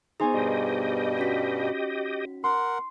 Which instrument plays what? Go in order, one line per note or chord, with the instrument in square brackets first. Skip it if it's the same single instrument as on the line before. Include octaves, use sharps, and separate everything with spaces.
[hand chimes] B3 G#4 [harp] D#4 C5 G#5
[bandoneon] G2 B2 G3 [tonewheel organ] G4 D#5
[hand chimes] C#4 F#4 B6
[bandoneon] A#4 F#5 [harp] C6